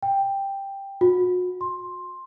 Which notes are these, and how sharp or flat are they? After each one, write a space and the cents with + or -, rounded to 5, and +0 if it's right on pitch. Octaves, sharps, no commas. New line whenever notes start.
G5 +10
F#4 -40
C6 +10